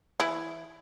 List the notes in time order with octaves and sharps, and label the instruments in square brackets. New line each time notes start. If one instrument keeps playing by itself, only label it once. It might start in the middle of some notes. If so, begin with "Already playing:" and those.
[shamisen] E3 E4